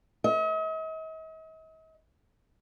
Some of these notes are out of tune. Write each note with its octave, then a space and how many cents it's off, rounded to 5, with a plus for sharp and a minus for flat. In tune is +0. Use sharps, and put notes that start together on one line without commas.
D#5 +45